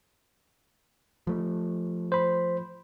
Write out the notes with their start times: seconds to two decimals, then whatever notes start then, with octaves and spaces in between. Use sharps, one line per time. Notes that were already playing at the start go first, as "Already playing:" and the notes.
1.27 F3 A3
2.12 C5 B5